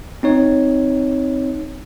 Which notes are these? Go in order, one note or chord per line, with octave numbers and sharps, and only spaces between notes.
C4 D#4 C#5